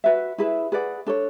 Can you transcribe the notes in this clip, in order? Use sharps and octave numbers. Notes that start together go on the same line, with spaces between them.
F#4 B4 E5
E4 G#4 B4 E5
G#4 B4 D5 F#5
D4 A4 C#5